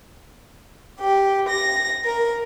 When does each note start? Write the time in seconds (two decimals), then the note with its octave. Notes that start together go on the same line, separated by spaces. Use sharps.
1.00 G4
1.48 A#6
2.04 A#4